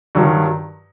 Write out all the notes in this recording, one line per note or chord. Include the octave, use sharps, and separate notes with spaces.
G2 D#3 F#3